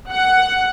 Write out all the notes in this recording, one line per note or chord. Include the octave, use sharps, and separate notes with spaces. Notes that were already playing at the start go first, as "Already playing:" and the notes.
F#5